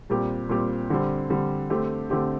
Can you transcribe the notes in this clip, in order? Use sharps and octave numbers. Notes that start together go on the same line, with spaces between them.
A#2 G3 C4 G4
A#2 G3 C4 G4
D3 G3 C4
D3 G3 C4
D3 A3 C4 G4
D3 A3 C4 G4